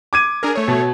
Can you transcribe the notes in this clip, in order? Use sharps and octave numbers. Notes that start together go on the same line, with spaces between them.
D6 G#6 D#7
D4 G#4 A#4
A3 C#5
B2